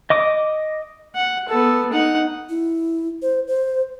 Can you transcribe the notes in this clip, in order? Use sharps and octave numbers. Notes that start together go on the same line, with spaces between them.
D#5 D6 D#6
F#5
B3 A4
D#4 F#5
E4
C5
C5